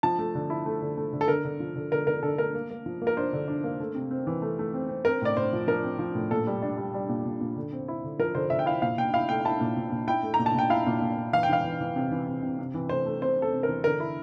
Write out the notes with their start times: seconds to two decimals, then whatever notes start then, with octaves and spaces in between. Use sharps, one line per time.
0.03 F3 A5
0.19 A3
0.35 D3
0.50 E4
0.66 A3
0.82 D3
0.98 A3
1.13 D3
1.21 A4
1.28 D3 A#4
1.45 D3
1.60 F3
1.76 D3
1.91 D3 A#4
2.07 D3 A#4
2.23 D3 A4
2.38 A3 A#4
2.55 A#3
2.70 A#3
2.86 F3
3.02 A#3
3.07 A#4
3.17 D4 C5
3.33 D3
3.48 D4
3.64 A#3
3.80 A3
3.95 C3
4.11 C4
4.27 E3
4.42 A3
4.59 A3
4.74 C4
4.89 C4
5.05 C4 A#4
5.22 A2 D5
5.37 A2 C5
5.53 F3
5.67 F3 A#4
5.83 C4
5.99 F3
6.15 A2
6.31 A#2 A4
6.47 G3
6.62 D4
6.77 G3
6.94 G3
7.09 A#2
7.25 A#2
7.41 A#2
7.56 D3
7.72 C4
7.88 E4
8.04 D3
8.19 F3 A#4
8.35 D3 C5
8.50 D3 E5
8.59 G5
8.66 E4 F5
8.82 A#2 F5
8.98 A#2 G5
9.14 E4 F5
9.29 A3 G5
9.45 E4 A5
9.61 A#2
9.77 A#2
9.92 A#2
10.07 E4 G5
10.23 A3
10.34 A#5
10.39 A#2
10.46 A5
10.54 A#2 G5
10.70 E4 F5
10.87 A#2
11.01 A#2
11.17 A#2
11.33 E3 F5
11.43 G5
11.49 E3 F5
11.65 E3
11.81 E3
11.96 C3
12.12 E3
12.27 C3
12.42 C3
12.59 C3
12.74 E3
12.89 A3 C5
13.06 A3
13.22 C4 C5
13.37 C4
13.42 A4
13.53 C3
13.63 A#4
13.69 E3
13.84 D3 A#4
14.00 E4